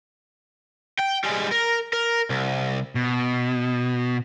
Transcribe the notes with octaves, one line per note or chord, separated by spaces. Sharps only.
G5
G3 G#3
A#4
A#4
C2
B2